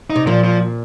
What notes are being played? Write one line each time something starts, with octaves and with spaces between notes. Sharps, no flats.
D#4
C3
A#2 F3
F3